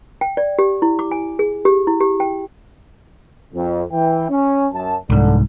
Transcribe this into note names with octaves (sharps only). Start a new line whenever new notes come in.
G5
D5
G4
E4
D6
G#5
G#4
G4
E4
G4
G5
F2
E3 G5
C#4
F#2 A5
C2 G#2 D3